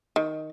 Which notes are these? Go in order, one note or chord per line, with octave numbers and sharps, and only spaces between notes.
D#3